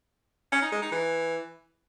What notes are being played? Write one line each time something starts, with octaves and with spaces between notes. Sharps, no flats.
C#4
D#4
G#3
D#4
E3